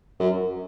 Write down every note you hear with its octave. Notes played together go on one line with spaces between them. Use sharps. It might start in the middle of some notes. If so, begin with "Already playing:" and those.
F#2